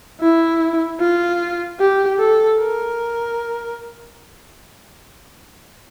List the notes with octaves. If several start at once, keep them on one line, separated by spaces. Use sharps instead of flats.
E4
F4
G4
A4
A#4